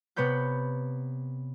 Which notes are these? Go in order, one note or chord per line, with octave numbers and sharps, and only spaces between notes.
C3 B3 C#5 B5 G6